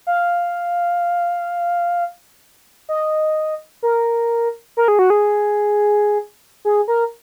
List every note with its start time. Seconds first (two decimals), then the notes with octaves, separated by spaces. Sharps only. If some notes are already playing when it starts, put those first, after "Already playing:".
0.07 F5
2.89 D#5
3.83 A#4
4.77 A#4
4.88 G#4
4.99 F#4
5.10 G#4
6.65 G#4
6.88 A#4